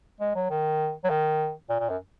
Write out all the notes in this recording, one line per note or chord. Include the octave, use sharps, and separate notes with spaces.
G#3
F#3
D#3
F#3
D#3
A#2
A#2
F#2